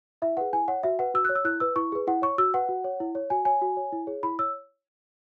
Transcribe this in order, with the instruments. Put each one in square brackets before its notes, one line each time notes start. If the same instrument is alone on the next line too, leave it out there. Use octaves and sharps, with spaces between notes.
[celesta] E4 E5
G#4 B4 F#5
E4 G#5
C#5 F#5
F#4 E5
B4 F#5
F#4 E6
F#6
C#5
E6
E4 F#6
B4 E6
E4 C#6
G#4 B4
E4 F#5
C#5 C#6
F#4 E6
B4 F#5
F#4
C#5
E4
C#5
F#4 G#5
C#5 G#5
F#4
C#5
E4
G#4 C#5
E4 B5
C#5 E6